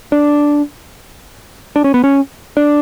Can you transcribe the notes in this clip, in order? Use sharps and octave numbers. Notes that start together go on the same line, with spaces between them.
D4
D4
C#4
B3
C#4
D4